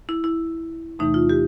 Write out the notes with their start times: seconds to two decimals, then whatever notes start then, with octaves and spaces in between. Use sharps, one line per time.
0.09 E4
0.24 E4
0.99 E2 C3 E3 A3 D#4
1.14 F4
1.29 G4